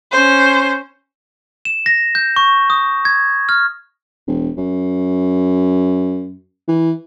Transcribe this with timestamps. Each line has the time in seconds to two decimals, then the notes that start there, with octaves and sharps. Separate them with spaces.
0.11 C#4 C5
1.65 E7
1.86 A#6
2.15 G6
2.36 C#6
2.70 D#6
3.05 G#6
3.49 F6
4.27 E1
4.57 F#2
6.68 E3